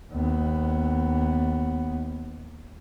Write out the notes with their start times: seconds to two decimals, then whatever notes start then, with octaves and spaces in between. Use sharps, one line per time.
0.12 D#2 B3